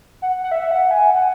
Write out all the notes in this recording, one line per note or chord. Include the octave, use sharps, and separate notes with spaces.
F#5
F#5
E5
F#5
G#5
F#5